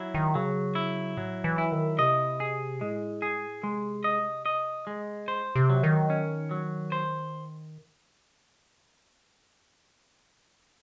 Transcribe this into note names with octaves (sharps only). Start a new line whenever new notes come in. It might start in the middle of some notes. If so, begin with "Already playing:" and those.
Already playing: F#3 E4
D#3
C#3 F#3
E4
A2 F#3
E3
E4
D#3
C3 D#5
G#4
A2 G#3
G#4
C3 G#3
D#5
D#5
G#3
A2 C5
C3
F#3
D#3
C#4
F#3
C5